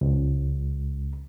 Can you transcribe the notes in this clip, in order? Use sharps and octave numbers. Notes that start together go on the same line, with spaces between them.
C#2